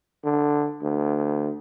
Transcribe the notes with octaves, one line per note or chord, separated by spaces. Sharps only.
D3
D2